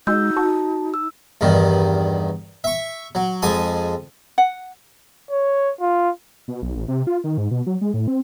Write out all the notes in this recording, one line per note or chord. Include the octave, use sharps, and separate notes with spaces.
G#3 D#4 F#4 E6 G6
F#4 A5
E6
E2 G2 D#3
E5 C#6
F#3
F2 G#3 G#5 A5 D#6
F#5
C#5
F4
B2
B1
A1
C3
F4
D#3
G#2
B2
F#3
G#3
A2
C4